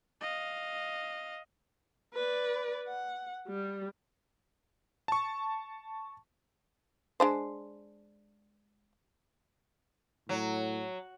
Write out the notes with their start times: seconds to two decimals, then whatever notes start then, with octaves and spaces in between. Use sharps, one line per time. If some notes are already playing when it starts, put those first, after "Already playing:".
0.21 D#5 F5
2.14 B4 D5
2.88 F#5
3.47 G3
5.08 A5 C#6
7.20 G#3 D4 C5
10.29 A2 F#3